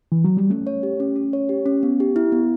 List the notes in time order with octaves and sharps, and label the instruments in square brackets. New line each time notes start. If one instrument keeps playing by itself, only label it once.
[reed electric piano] E3
F#3
G3
[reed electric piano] A3 [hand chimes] C#4
[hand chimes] C#5
G4
C#4
C#4
C#5
G4
C#4
B3
G4
E4
B3